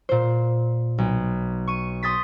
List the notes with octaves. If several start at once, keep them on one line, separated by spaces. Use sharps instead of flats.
A#2 C5
B1
C#6 D#7
C6 D#6 G6 A6 B6